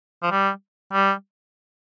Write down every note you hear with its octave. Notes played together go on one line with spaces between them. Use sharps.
F3
G3
G3